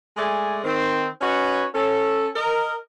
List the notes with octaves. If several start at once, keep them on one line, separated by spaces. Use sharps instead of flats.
G#3 A3 D5 G#5
D#3 C4
C#4 D#4 F#4 B4 C#5
C#4 A4
A#4 D#5